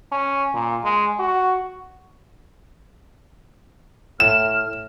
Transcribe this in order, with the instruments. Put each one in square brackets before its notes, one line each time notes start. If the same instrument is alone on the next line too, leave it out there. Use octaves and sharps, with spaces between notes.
[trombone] C#4
A#2
G#3
F#4
[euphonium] A2 [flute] F6 [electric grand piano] E7